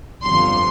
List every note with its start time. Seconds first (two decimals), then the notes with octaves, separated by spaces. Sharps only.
0.22 G1 F2 D3 F3 C6